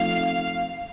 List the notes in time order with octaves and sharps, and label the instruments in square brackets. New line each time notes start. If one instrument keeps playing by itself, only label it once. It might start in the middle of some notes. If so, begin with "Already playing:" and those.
Already playing: [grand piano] F3 A3 C4 D#4 [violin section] F5